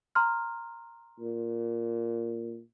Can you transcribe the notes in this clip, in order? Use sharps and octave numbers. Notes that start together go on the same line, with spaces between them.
A#5 C6 F6
A#2